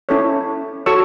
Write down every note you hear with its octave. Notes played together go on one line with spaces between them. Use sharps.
C#4 E4 A4 C#5
F#4 A4 C#5 C#6 E6